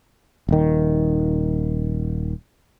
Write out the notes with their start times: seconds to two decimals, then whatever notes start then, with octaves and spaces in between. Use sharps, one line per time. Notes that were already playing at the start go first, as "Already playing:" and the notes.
0.49 D#1 D#3